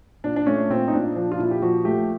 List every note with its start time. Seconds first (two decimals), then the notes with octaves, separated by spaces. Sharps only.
0.24 A#2 D4
0.36 D4
0.46 A3 C#4
0.70 A#2 C4
0.88 D#4
0.93 A#2 D4
1.16 F3 D4
1.31 F4
1.39 A#2 E4
1.51 G4
1.62 F3 F#4
1.85 A3 G4